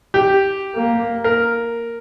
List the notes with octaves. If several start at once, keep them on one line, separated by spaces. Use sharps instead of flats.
G4
A#3
A#4